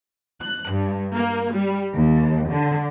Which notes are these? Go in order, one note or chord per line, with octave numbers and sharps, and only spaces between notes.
F#6
G2
A#3
G3
D#2
D3